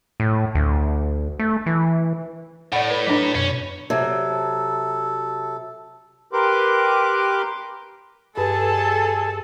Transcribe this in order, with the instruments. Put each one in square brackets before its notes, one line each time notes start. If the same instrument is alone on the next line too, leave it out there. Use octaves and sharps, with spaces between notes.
[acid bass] A2
D2
A3
E3
[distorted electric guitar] A2 [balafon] D5 F#5
[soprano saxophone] B4
[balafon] F#3 D4 [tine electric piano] B6
[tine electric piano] F#2 B2 [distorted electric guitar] C#4
[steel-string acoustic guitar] C3 F#3 [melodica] A4
[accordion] G4 A#4 B4 C6 D6
[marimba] G2 B4 [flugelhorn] G#4 [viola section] A4 [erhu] A5